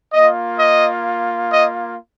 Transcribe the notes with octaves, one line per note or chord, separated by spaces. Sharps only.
A#3 F4 D#5
D#5
D#5